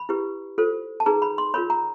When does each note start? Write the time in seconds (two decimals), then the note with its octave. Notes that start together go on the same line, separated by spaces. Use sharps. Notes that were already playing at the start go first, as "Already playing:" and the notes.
Already playing: B5
0.09 E4 G4 B4
0.58 F4 A4 C5
1.00 A5
1.06 D#4 G#4 B4 A#5
1.22 B5
1.38 C6
1.54 F4 A#4 C#5 B5
1.70 A#5